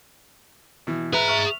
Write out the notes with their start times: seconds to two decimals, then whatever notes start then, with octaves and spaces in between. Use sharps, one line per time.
0.87 B2 E3
1.13 G#4 B4 E5 A#5
1.28 E5 C#6 F6